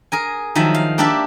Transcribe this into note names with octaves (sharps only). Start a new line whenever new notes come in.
G#4 A#4 G#5
D#3 F3 F#3 E5
F5
A#3 D4 G4 D5 E5 A5